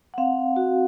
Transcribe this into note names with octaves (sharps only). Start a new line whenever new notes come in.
F#5
C4 F5
F#4